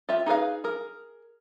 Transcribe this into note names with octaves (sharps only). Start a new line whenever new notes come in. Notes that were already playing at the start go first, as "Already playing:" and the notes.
F4 G4 E5
D#4 G#4 B4 F5
G#4 A#4